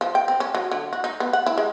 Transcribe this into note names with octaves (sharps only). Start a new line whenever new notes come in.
F3
G5
C4
C#4
F#3
D3
F#4
D#4
B3
F#5
E4
G#3